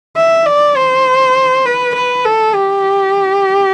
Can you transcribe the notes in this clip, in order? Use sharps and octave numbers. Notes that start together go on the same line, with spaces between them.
E5
D5
C5
B4
B4
A4
G4